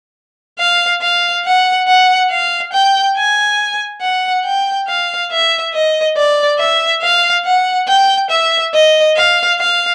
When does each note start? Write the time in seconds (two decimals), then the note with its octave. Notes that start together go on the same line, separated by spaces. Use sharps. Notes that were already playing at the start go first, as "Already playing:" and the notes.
0.59 F5
1.02 F5
1.45 F#5
1.88 F#5
2.31 F5
2.73 G5
3.17 G#5
4.01 F#5
4.45 G5
4.87 F5
5.31 E5
5.74 D#5
6.17 D5
6.59 E5
7.02 F5
7.45 F#5
7.88 G5
8.30 E5
8.74 D#5
9.16 F5
9.59 F5